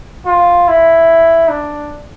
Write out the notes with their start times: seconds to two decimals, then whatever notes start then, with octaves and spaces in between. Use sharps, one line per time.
0.26 F4
0.68 E4
1.49 D4